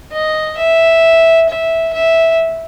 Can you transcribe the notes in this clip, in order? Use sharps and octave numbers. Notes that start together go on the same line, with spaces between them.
D#5
E5
E5
E5